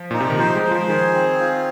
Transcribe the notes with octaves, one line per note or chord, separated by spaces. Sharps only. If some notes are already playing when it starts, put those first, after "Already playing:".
Already playing: F3
A#2 D#4
C3
D#3
F3 C5
G#3
C5
F3
D#3 G#4
C4
F4